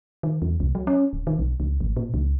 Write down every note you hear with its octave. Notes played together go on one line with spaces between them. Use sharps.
D#3
E2
C2
F#3
C#4
D1
D#3
B1
C#2
G#1
A#2
C#2